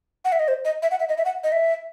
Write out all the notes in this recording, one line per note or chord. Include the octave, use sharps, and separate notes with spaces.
F#5
E5
D#5
C5
D#5
E5
F#5
E5
D#5
E5
F#5
D#5
E5